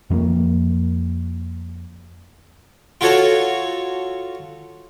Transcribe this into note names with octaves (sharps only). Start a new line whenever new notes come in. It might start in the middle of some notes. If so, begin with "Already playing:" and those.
F2 F3 A3 A#3
F4 F#4 A4 C#5